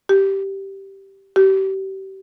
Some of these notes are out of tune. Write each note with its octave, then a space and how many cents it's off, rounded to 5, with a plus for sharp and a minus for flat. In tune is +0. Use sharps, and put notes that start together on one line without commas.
G4 -10
G4 -30